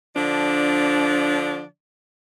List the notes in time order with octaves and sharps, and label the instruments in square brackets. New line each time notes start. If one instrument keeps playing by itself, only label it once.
[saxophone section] D3 F3 D4 D5